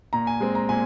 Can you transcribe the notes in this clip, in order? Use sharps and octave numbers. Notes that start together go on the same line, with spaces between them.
A#2 A#5
G#5
G#3 C4
A#5
A#2 G#5